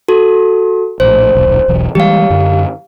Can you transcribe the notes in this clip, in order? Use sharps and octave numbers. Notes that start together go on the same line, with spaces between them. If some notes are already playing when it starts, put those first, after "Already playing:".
F#4 A4
A#1 A2 C5
D#1 B1
E1 B1 E2
E3 G3 G#3 G4 F5
F#2 D3